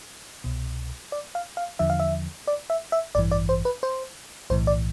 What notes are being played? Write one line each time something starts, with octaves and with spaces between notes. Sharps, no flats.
C2 B2
D5
F5
F5
E2 D3 F3 E5
F5
E5
D5
E5
E5
A1 G2 E3 D5
D5
C5
B4
C5
B1 A2 E3 C5
D5